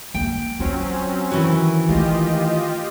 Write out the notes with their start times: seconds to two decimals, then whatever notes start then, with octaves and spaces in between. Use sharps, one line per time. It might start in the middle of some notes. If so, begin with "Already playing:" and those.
0.14 A#3 G5
0.60 F#3 C4 C#4 F4
1.31 D#3 E3 F#4
1.88 A3 D#4 F4 G4 D#5